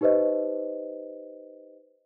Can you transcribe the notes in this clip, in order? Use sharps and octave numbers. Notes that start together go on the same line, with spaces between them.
D#4 G4 B4 C5 D#5